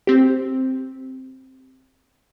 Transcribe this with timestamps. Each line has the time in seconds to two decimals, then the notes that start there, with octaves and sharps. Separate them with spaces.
0.07 C4 G4